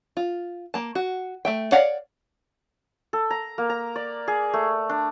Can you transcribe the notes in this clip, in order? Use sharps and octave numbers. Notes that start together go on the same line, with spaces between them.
F4
A#3 A5
F#4
A3 E5 G5
C#5 D5 F5 F#5
A4
A#5
A#3
A#5
D5
G#4
A3
D4